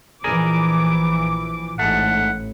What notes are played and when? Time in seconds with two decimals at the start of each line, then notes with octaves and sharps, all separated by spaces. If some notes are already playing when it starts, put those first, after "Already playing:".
0.24 A#1 E3 F3 G#4 A#4 D5 D6
1.79 A1 G#2 A3 F#5